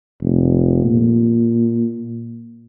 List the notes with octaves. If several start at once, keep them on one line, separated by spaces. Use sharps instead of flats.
F1
A#2